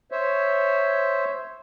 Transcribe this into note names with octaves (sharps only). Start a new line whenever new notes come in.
C5 C#5 E5